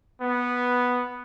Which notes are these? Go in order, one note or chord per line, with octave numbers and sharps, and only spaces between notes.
B3